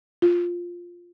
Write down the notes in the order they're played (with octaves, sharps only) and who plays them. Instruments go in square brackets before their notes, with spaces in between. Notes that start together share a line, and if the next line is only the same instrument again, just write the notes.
[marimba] F4